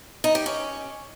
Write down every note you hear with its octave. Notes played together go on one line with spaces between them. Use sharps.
D#4
G4
C#4